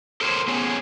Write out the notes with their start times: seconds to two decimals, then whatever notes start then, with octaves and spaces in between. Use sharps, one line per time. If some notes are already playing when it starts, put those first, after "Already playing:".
0.21 A4 A#4 C5 C#5
0.47 B3 C#4 G#4 C#5